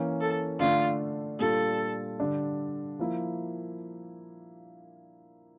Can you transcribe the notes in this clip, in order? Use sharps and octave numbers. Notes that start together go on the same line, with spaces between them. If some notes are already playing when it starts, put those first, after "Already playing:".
Already playing: E3 A#3 C#4
A4
D3 A3 D4 F4
A#2 G3 D4 F4 A4
D3 G3 D4
F3 A#3 E4